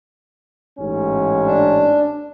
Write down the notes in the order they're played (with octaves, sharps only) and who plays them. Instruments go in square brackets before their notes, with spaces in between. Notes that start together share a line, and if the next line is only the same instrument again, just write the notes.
[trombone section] A1 G#2 C#4
[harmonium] D4